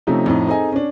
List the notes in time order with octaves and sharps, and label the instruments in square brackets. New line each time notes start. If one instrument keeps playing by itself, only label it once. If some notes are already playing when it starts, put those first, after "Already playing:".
[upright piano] C3 F3 A3 C4 C#4 D#4
F2 A2 D#4
C4 D#4 G#4 A4 D#5 G#5
C#4 D4